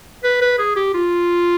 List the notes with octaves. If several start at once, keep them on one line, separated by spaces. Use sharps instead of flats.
B4
B4
G#4
G4
F4